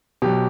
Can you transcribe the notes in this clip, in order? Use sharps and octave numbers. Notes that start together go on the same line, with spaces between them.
B2 F#3 G4